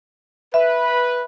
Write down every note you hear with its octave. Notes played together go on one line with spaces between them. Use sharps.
B4 E5